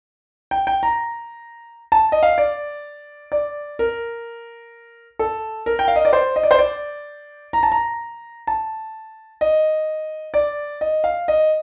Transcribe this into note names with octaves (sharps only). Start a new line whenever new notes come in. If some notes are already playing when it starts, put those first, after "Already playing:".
G5
G5
A#5
A5
D#5
F5
D5
D5
A#4
A4
A#4
G5
F5
D#5
D5
C5
D#5
D5
C5
D5
A#5
A5
A#5
A5
D#5
D5
D#5
F5
D#5